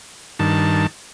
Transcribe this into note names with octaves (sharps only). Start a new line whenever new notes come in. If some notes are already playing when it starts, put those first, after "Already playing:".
G2 D#3 A5